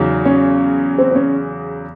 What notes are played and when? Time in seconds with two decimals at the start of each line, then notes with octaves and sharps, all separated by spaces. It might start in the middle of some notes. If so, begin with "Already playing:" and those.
Already playing: E2 C#3 F#3 D#4
0.25 C#4
0.98 C4
1.11 C4
1.15 C#4